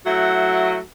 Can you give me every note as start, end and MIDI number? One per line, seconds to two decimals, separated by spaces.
0.05 0.77 54
0.05 0.77 57
0.05 0.77 64
0.05 0.77 66